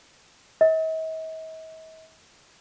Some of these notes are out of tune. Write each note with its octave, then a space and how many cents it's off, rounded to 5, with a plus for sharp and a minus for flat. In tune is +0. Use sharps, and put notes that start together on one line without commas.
D#5 +45